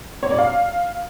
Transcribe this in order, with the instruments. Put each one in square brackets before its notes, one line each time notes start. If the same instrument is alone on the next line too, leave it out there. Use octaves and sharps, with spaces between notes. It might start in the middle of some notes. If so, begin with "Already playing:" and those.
[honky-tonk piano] C#5
D5
F5